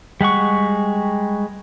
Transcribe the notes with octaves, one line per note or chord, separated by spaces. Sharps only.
G3 G#3 F#5 C#6